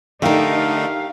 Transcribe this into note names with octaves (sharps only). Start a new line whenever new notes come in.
D3 A3 D#4 G4 A#4 F5